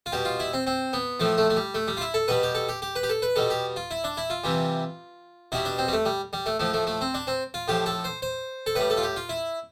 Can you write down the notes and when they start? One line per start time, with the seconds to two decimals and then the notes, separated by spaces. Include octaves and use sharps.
0.06 F4
0.12 B2 G3 G4
0.25 F4
0.40 E4
0.53 C4
0.67 C4
0.93 B3
1.20 A2 F3 A3
1.38 A3
1.50 A3
1.57 G3
1.74 A3
1.88 G3
1.97 F4
2.01 E4
2.14 A4
2.28 B2 G3 B4
2.43 G4
2.55 A4
2.69 G4
2.82 G4
2.96 B4
3.03 G4
3.10 A4
3.22 B4
3.36 B2 G3 A4
3.50 G4
3.76 F4
3.91 E4
4.04 D4
4.17 E4
4.30 F4
4.44 C3 E3 G3
5.52 B2 G3 E4
5.65 D4
5.78 C4
5.88 G3
5.93 A3
6.05 G3
6.33 G3
6.46 A3
6.59 A2 F3 A3
6.74 A3
6.87 A3
7.01 C4
7.14 D4
7.27 C4
7.54 F4
7.68 A2 F3 G4
7.86 A4
8.04 C5
8.22 C5
8.66 A4
8.75 A2 G3 B4
8.90 A4
8.97 F4
9.03 G4
9.16 F4
9.29 E4